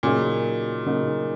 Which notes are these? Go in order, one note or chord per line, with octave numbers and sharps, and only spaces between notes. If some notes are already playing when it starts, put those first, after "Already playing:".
A#2 C#3 F#3 A#3 D#4
C#3 F#3 A#3 D#4